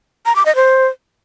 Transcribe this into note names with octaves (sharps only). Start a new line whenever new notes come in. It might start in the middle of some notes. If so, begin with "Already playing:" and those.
A#5
D6
D#5
C5